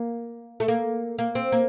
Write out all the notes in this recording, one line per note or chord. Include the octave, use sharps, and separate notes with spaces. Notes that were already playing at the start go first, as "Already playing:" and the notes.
Already playing: A#3
A3
A#3
A#3
C4
A#3